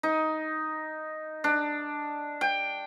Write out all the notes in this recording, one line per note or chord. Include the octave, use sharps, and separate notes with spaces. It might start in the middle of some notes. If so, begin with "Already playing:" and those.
D#4
D4
G5